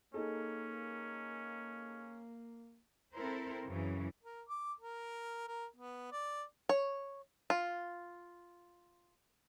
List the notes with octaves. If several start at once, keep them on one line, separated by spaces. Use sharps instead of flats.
A#3 C#4 D#4 G#4 A4
C4 E4 A4 A#4 C5
F#2 C#3 E3
A#4
D6
A#4
A#4
B3
D5
C#5
F4